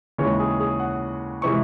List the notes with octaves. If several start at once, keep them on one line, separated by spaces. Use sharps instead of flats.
D#2 C#3 E3 G#3 C#4 C#5
G#4
G#4
F#5
C3 E3 G#3 C#6